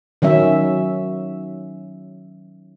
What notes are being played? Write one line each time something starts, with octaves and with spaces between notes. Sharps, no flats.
D#3 F#3 C#4 E5